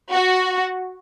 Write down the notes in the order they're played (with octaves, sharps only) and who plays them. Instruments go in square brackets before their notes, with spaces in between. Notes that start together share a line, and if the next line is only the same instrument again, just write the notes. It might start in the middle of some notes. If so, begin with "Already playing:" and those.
[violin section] F#4